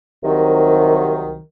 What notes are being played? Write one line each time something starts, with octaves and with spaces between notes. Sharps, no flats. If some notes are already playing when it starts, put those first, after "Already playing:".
C2 C3 D#3 F#3